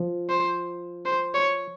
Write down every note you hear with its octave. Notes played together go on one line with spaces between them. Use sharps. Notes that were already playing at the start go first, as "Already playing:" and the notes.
Already playing: F3
C5
C5
C#5